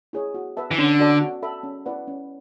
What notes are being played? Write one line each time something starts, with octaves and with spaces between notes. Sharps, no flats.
E4 G#4 C#5
F#4
B4 E5 A5
E3
D3 C#4
F#4 A4 D5 A5
F#4
A4 E5 B5
C#4
E4 B4 D5 F#5
C#4